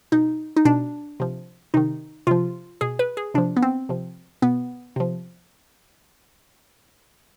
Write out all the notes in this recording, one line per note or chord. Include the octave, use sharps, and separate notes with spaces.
B2 D#4
D#4
B2 D4
C3 F3
C3 D#3 D#4
C3 F3 F4
B2 G#4
B4
G#4
C3 F3 D4
B3
C4
C3 F3
B2 B3
C3 F3